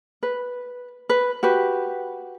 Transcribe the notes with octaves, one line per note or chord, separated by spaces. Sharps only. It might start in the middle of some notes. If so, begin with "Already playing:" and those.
B4
B4
F#4 G4 B4